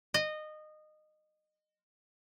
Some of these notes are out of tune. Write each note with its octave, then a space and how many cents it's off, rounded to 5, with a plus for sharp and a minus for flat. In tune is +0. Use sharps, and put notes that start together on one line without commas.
D#5 -20